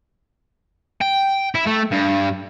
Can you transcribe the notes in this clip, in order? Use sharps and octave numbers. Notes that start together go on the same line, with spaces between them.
G5
E4
A3
G2